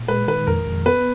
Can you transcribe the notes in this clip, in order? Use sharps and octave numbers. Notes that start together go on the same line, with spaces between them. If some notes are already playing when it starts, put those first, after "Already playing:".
Already playing: A#2
G#3 B4
D#3 B4
F2 A#4
F2
B3 B4